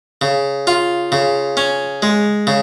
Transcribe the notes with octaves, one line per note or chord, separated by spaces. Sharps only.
C#3
F4
C#3
C#4
G#3
C#3